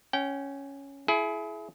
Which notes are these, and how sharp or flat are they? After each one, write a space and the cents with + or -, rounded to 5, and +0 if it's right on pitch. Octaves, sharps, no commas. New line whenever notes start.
C#4 +0 G5 -25
E4 +15 G#4 +35